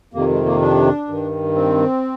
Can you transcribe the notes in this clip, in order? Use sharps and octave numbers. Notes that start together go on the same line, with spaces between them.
F2 C3 D#3 A#3
G#3
A#3
D4
G2 D#3
C4